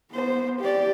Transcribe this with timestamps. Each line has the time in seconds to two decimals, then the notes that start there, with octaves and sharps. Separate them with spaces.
0.12 B3 C5
0.60 G4 D5